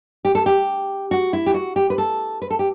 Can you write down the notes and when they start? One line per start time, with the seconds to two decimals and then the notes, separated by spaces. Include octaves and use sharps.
0.25 G4
0.35 A4
0.46 G4
1.11 F#4
1.33 E4
1.46 G4
1.54 F#4
1.76 G4
1.90 B4
1.98 A4
2.42 B4
2.50 A4
2.59 G4